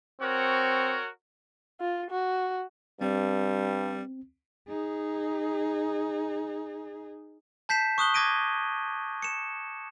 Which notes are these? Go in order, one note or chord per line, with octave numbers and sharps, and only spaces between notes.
C4 F#4 A#4 C#5
F4
F#4
G2 G3 C4
D#4 G#4
A5 G6 B6 C7 E7
C#6 D#6 F#6 G7
D6 G#6 A#6 D7 D#7
C#7 E7